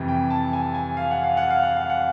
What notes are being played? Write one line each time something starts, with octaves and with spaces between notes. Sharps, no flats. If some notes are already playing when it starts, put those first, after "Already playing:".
Already playing: F2 C3 E3 G3
G5
A5
G#5
G#5
F5
F#5
F5
F#5
F5
F#5
F5
F#5